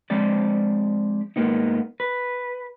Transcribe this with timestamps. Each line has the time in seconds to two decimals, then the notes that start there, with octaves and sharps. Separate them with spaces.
0.10 F3 G#3 C4 D5
1.36 G#2 A#3 B3 D#4
2.00 B4